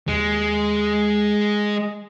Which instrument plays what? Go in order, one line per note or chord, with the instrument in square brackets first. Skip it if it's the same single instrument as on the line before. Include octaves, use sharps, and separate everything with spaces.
[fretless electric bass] D#2 [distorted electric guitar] G#3